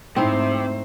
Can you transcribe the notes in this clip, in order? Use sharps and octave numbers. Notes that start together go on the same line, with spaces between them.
G#2 C3 A3 C4 D#4 E4 C5